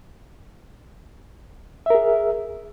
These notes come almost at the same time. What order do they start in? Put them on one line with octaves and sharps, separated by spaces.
E5 A#4 G#4